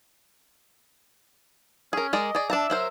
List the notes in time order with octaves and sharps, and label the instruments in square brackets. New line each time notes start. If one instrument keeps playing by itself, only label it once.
[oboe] C#4 [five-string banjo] G#4 A#4
[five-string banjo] G#3 A#4 D5 [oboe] D#5
[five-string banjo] G#4 D5
[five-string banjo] D4 A5 A#5 [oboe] E5
[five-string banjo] F#3 A#4 C5